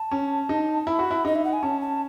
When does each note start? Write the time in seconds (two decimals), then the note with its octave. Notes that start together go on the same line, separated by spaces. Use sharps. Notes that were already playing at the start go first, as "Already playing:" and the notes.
Already playing: A5
0.11 C#4
0.49 D#4
0.87 E4 B5
0.99 F#4
1.11 E4
1.25 D#4 D#5
1.35 E5
1.45 F#5
1.53 G#5
1.63 C#4 A5
1.81 A5